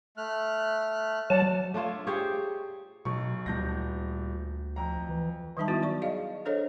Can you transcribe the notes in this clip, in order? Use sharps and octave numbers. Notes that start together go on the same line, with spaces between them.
A3 F6 F#6
F#3 D5 F#5 A5
A3 D4 F4 C#5
G4 G#4 C5 C#5
B1 B2 C#6
D#1 D2 G6 A#6
F2 A#5
E3
D#3 F#3 G3 D#4 E5 A5
B3 E4 F#4
D5 C#6
G#4 D5 D#5 F5
D4 A4 C5 C#5 D#5